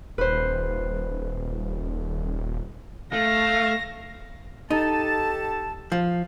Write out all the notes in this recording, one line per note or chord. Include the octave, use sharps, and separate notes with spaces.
D#1 B4 C5
A3 F5 A#6
D#4 G4 A4 A5
F3